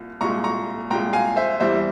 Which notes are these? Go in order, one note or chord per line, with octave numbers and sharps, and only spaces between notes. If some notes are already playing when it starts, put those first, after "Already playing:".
Already playing: C2 A#2
C2 A#2 G#3 A#5 C#6
A#5 C#6
C2 A#2 G#3 G5 A#5
F5 G#5
C5 E5
E2 E3 G3 C5 E5